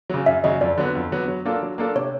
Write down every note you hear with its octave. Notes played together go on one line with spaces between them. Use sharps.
C#3 F#3
F#2 E5
C#3 F#3 D#5
F2 D5
D3 F#3 B3
F2
D3 F#3 B3
F#3
A#3 D4 F4 A4
F#3
A#3 D4 F4 A4
C3 C#5